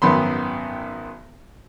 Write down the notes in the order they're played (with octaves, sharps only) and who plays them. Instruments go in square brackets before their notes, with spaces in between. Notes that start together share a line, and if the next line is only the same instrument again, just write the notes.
[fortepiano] G#1 F#2 D#3 B3 B5 C6